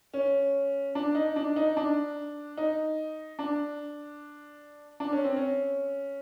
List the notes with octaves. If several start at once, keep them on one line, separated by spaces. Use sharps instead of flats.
C#4
D4
D#4
D4
D#4
D4
D#4
D4
D4
C#4
C4
C#4